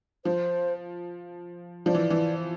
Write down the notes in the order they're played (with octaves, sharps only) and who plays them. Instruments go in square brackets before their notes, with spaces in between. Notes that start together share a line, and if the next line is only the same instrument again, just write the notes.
[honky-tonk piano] F3 [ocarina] C5
[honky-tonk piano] F3 [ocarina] D5
[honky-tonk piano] E3
E3